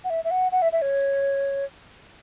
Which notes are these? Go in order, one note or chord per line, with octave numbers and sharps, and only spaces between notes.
F#5
E5
E5
F#5
F#5
E5
E5
C#5